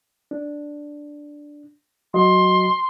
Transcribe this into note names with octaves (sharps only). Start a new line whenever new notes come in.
D4
F#3 F#4 D#5 C6